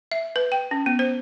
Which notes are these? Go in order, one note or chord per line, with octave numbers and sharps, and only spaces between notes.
E5
B4
G5
C#4
B3
C5